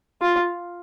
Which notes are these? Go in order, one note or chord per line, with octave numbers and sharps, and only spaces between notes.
F4